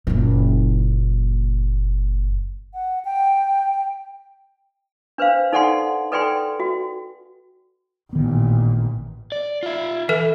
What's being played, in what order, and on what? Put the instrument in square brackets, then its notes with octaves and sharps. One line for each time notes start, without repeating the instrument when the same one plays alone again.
[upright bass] F#1 A#2
[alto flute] F#5
G5
[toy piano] D4 B4 C5 F5
D#4 A4 D5 F#5 G#5 C6
A4 B4 D5 G5 G#5 C6
F#4
[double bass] A1 A#2 [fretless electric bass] D#3 B3
[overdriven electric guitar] D5
F4 E5
[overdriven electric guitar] E3 [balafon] A4 B4 E5